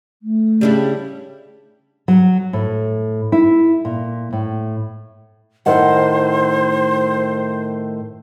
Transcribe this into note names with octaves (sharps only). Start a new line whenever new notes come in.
A3
C#3 G3 D4 E4
F#3
A2
E4
A#2
A2
A2 D#3 C5 F#5